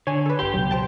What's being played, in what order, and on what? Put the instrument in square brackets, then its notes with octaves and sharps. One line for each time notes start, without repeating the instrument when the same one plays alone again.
[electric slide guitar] D3 [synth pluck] C#5 G#5
[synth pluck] A4 B4
[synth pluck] G1 G5 C6 [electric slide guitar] G4
[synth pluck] C#2 B2 F#3
C5 G5 A5